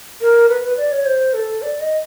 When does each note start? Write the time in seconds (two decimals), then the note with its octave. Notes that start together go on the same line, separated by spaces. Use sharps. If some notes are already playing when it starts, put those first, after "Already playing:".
0.21 A#4
0.49 B4
0.63 B4
0.77 D5
0.92 C#5
1.06 C5
1.34 A4
1.62 D5
1.80 D#5